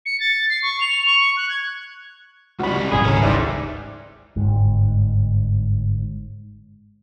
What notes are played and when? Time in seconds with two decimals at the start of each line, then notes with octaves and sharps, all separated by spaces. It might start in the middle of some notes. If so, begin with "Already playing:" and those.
0.06 C#7
0.20 A6
0.50 C7
0.63 C#6
0.81 F7
1.06 C#6
1.37 F#6
1.49 G#6
2.59 C#2 G3 F#4 B5
2.92 D1 G#1 C#3 G#4 B5
3.05 C#4 A4 A#4
3.23 E3 G3 G#3 D#4 C5 D5 E5
4.36 G1 G#2